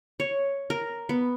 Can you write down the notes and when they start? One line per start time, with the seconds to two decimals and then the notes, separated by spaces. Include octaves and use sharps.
0.20 C#5
0.70 A#4
1.09 B3